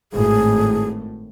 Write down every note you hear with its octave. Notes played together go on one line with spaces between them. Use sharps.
G#1 A2 G#4